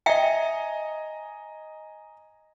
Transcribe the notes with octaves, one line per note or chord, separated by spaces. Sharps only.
D#5 E5 G5 G#5 A#5